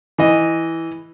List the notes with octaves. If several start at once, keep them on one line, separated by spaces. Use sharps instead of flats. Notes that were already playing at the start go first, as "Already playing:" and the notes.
E3 D#5